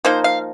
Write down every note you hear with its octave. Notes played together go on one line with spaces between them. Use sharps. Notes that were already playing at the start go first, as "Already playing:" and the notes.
F3 A#3 D#4 C5
F5